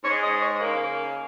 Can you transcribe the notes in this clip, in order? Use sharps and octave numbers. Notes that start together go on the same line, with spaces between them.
G#2 G#3 C#5
D#5
C#5
C#3 A#3 A#4